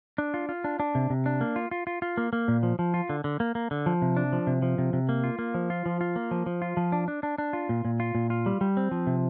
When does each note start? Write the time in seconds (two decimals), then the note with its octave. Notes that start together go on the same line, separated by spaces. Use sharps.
0.18 D4
0.34 F4
0.49 F4
0.64 D4
0.80 D4
0.95 C3
1.10 C3
1.26 D4
1.41 A#3
1.56 F4
1.71 F4
1.87 F4
2.02 F4
2.17 A#3
2.33 A#3
2.48 A#2
2.63 F3
2.79 F3
2.94 F4
3.09 D3
3.24 D3
3.40 A#3
3.55 A#3
3.71 D3
3.86 F3
4.02 C3
4.17 D4
4.33 F3
4.47 C3
4.62 F3
4.78 C3
4.93 C3
5.09 A#3
5.24 F4
5.39 A#3
5.54 F3
5.70 F4
5.86 F3
6.01 F4
6.16 A#3
6.31 F3
6.46 F3
6.62 F4
6.77 F3
6.92 D4
7.08 D4
7.23 D4
7.38 D4
7.53 F4
7.69 A#2
7.85 A#2
8.00 F4
8.15 A#2
8.30 F4
8.46 G3
8.61 G3
8.77 C4
8.91 F3
9.07 C3